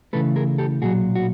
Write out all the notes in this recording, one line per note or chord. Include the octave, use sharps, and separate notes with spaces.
C#3 E3 A3 A4 B4
G#4 A#4
G4 A4
B1 A#2 F#3 F#4 G#4
F#4